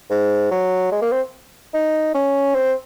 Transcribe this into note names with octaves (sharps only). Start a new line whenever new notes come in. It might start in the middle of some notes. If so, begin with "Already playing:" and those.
G#2
F#3
G#3
A#3
C4
D#4
C#4
C4